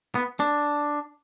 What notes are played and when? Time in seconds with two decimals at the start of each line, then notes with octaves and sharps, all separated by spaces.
0.15 B3
0.40 D4